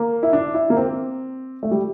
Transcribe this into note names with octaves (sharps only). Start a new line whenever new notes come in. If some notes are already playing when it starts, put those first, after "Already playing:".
Already playing: A#3
E4
D4
E4
A#3
C4
A3
G3